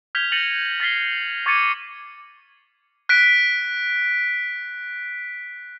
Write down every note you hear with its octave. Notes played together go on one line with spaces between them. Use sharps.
F6 G6 G#6 B6 F7 G7
G6 A6 A#6 C#7 D#7 F#7
F6 A6 B6 C7 G7
C#6 D6 G#6 A6 C#7 D#7
F#6 B6 D7